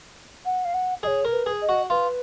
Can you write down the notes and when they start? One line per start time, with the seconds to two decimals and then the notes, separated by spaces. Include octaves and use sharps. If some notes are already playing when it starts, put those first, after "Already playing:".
0.45 F#5
0.65 F5
0.74 F#5
1.03 G#4 D#5
1.07 C#5
1.25 A#4
1.32 B4
1.46 G#4
1.61 D#5
1.69 F#4
1.90 F4 B4